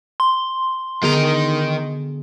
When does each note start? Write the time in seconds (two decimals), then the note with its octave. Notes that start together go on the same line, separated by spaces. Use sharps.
0.20 C6
1.03 D3 D#3 B3 G#4 A#5